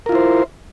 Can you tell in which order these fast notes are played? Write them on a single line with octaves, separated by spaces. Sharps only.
A#4 F4 E4 C5